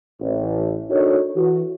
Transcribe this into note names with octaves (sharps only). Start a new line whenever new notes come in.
A1
D4 D#4 F#4 A4 A#4 C#5
E3 F#4